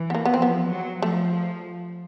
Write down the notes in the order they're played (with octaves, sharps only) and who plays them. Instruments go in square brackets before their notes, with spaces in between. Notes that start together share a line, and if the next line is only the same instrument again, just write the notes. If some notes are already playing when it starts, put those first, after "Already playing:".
Already playing: [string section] E3
[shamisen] B3
A#3
B3
C4
[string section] F3
[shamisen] B3
[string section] F#3
[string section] F3 [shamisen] A3